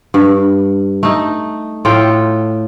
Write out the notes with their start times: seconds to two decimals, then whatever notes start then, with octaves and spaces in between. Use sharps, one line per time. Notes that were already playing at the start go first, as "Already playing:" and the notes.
0.14 G2
1.03 A3 D#4
1.85 A2 F4 A4 G5